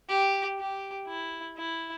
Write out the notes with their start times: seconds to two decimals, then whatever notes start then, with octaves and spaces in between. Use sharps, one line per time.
0.09 G4
0.58 G4
1.08 E4
1.58 E4